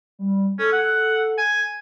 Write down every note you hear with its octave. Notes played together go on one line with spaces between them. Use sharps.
G3
C#4 A4
F#5
G#5